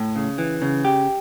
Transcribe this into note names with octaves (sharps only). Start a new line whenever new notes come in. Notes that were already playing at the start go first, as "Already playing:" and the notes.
Already playing: A2
C#3
E3
C#3
G4